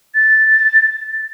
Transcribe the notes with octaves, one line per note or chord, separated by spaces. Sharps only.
A6